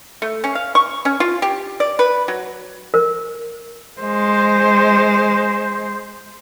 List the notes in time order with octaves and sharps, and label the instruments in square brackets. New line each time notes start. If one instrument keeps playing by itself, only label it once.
[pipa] A3
C#4
F5
C#6
C#4
F4
G4
D5
B4
F#3
[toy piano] A#4
[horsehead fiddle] G#3 C5